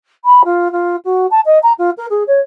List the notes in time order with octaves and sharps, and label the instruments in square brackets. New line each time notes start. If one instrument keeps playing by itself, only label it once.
[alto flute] B5
F4
F4
F#4
A5
D#5
A#5
F4
A#4
G#4
C#5